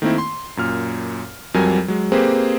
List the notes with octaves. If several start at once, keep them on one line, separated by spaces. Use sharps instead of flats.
D#3 A3 A#3 C4 E4
C6
F#2 A#2 F6
F2 F#3 G3 A#4 G#5
F#3 G#3
A#3 C4 G4 G#4 B4 C5